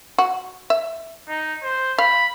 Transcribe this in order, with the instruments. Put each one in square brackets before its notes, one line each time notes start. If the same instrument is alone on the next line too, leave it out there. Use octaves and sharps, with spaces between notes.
[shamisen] F#4
E5
[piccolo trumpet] D#4
C5
[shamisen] F5 [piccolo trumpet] B5